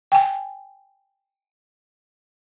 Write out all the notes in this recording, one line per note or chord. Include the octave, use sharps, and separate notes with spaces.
G5 G#5